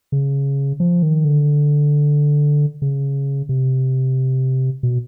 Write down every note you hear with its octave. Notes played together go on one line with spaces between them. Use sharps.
C#3
F3
D#3
D3
C#3
C3
B2